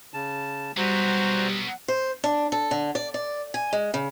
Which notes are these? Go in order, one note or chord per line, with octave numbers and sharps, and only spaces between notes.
C#3 A5
F#3 G3 B3 F#4 C5 A#5
C5
D4
A4
D3
D5
D5
G#5
G#3
C#3